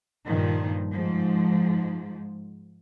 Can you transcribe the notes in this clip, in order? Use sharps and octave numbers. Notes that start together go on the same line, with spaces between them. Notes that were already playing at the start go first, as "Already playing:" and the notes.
G2 A#2 D#3 F3
G#2 F3